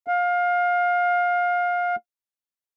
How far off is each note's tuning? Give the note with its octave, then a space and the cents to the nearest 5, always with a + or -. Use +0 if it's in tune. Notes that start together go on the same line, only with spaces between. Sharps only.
F5 +25